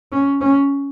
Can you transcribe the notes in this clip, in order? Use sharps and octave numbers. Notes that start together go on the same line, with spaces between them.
C#4
C#4